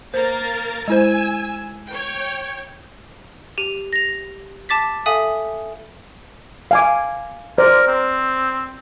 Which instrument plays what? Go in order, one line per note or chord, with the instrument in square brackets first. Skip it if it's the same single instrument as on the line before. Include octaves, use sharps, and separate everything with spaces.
[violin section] A#3 A#4 A6 [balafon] C5
[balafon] G#3 E4 C5 [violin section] G#5 E6
[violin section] C#5 G5
[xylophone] G4 D#7 F7
A#6 F7
A5 D6 A6 B6
A4 E5 F5 G#5 D#6
[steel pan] F5 G#5 D6
[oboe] A#4 [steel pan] C5 D5
[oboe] C4